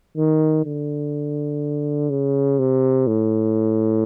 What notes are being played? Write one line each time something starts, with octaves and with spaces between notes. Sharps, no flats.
D#3
D3
C#3
C3
A2